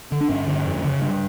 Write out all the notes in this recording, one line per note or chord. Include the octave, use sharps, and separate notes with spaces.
D3
D4
G2 C#4
D3
F2
C#3
G2